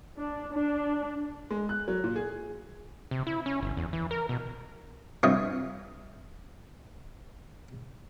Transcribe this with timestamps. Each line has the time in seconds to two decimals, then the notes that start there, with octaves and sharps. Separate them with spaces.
0.20 D4
0.53 D4
1.51 G#3
1.69 F#6
1.88 F#3
2.04 A#2
2.16 G#4
3.11 C3
3.27 E4
3.46 C#4
3.63 G1
3.77 E2
3.93 E3
4.11 A#4
4.29 B2
5.23 G2 C3 F4 C#5 D#5